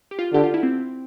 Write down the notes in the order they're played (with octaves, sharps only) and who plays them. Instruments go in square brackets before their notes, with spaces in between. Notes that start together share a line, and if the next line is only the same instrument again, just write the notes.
[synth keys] G4
F4
[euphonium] D3 [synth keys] G4
[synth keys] F4
E4
C4